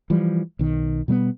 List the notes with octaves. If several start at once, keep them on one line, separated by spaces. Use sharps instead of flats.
E3 F3 G3
B1 D#3
B2 G3 G#3 B3